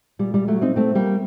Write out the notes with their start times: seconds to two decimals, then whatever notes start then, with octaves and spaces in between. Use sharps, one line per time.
0.19 A#2 G3
0.34 G3
0.48 F#3 A3
0.62 C4 D#4
0.76 A3 C4
0.95 G3 A#3